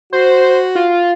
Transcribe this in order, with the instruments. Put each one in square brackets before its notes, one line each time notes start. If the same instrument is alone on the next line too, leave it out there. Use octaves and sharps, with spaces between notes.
[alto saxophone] F#4 [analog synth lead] C5
[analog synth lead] F4